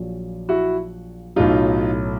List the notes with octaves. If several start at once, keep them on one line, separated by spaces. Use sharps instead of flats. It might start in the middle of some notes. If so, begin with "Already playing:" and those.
Already playing: A#1 A#2 F#3
E4 F#4
B1 A2 F#3 D#4 F4